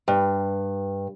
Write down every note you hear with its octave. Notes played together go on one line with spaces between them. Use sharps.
G2